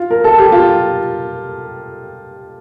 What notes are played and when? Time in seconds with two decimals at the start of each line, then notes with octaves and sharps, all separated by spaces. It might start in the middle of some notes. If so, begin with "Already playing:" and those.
Already playing: F4
0.11 A#4
0.24 A4
0.38 G4
0.52 F4